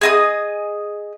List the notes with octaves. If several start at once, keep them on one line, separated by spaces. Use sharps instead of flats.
G#4 D#5 D#6